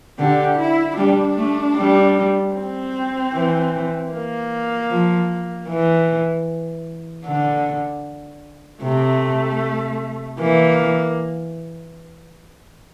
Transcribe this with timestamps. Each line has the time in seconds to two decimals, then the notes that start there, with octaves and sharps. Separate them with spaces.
0.19 D3 G4
0.58 E4
0.98 G3 D4
1.37 A3
1.76 G3
2.54 C4
3.33 E3
4.12 A#3
4.90 F3
5.69 E3
7.26 D3
8.82 C3 A3
10.40 E3 A#3